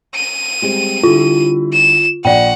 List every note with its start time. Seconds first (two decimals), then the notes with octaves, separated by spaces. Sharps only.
0.15 D#7
0.62 G3 G#3 C4
1.03 D3 G3 E4 F4
1.73 E7
2.25 A#1 D5 F#5 G5